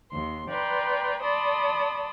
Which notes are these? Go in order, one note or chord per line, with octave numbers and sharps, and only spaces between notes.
D#2 C6
B4 D5 G5 A#5 C6
D5 A5 B5 C6 D#6